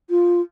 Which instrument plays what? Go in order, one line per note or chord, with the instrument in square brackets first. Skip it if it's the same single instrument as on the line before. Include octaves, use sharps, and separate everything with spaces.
[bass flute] F4